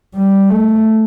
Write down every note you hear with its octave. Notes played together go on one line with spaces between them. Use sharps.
G3
A3